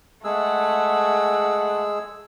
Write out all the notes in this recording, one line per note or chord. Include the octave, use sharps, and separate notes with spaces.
G#3 A3 G#4 F#5 E6